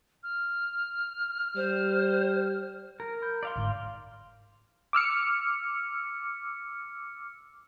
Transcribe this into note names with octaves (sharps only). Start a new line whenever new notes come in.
F6
G3 C5
A#4
B5 G6
D5 F5 C6
G1 G#2
D6 E6 F6 C#7